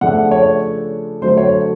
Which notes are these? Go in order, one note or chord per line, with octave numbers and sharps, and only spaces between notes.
C#3 F3 A3 D4 F#5
C#5
D3 F#3 A3 D4 C5
C#5